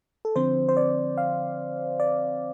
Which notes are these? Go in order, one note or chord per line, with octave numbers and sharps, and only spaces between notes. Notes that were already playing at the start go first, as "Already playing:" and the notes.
A4
D3 F3 C4 C5
C5
D5
F5
D5